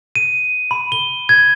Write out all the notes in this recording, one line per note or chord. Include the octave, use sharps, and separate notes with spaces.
D#7
B5
G7
G#6